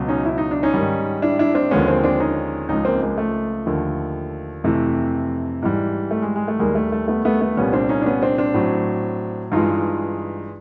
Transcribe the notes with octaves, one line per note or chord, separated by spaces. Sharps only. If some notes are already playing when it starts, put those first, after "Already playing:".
Already playing: C#2 B2 F#3
C#4 D#4
E4
D#4
D4
C#4 D#4
G#2 D#3 G3
D4 E4
D4 E4
C4 D4
D#2 D3 F3 G#3 B3 C#4
A#3 C4
C4 D4
C#4 D#4
C#2 C#3 F3 G#3 C#4 D#4
A#3 C4
G#3 A#3
A3
D#2 D3 F3
F2 C3 E3 A3
G#2 E3 G3
A3
G#3
G#3
A3
D#2 D#3 G3 G#3 A#3
A3
A3
A3 B3
A3 B3
A3 B3
C2 A#2 G3 B3 C#4
C4 D4
C#4 D#4
D4
B3 C#4
C4 D4
C4 D4
A2 F#3
G2 E3 G#3 D#4 F4